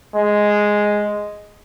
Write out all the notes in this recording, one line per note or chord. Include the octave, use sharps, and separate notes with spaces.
G#3